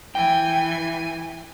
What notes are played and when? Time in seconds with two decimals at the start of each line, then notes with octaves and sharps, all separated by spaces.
0.15 E3 G5 G#5